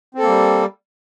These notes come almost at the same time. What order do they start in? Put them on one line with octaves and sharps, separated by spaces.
C4 A4 A#3 G3